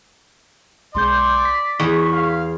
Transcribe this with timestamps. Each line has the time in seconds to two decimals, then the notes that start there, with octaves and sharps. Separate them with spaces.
0.95 B1 G#3 D5 C6 G6
1.45 B6
1.80 E2 C#6
2.13 F5